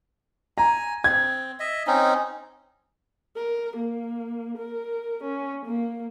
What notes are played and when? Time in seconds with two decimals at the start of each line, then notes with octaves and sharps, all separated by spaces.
0.58 G#5 A#5
1.04 C4 G#6
1.60 D#5 E5
1.87 C4 C#4 D#4
3.36 A#4
3.76 A#3
4.58 A#4
5.24 C#4
5.66 A#3